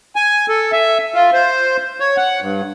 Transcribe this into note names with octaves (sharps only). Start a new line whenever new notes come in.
G#5
A4
E5
F4
C5
C#5
F#5
G2